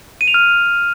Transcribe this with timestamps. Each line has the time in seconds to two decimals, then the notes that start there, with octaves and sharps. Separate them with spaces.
0.21 D#7
0.28 F7
0.34 F6